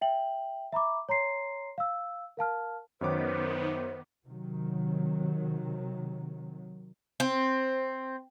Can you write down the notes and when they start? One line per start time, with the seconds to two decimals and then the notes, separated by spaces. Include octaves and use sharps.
0.01 E5 G5 F#7
0.72 E5 A#5 B5 D6
1.09 C#5 A#5 C6 C7
1.78 F5 E6
2.37 A#4 F5 A5 F6
3.01 F#2 D#3 B3 C5 C#5 D6
4.26 C3 D#3 F#3
7.20 C4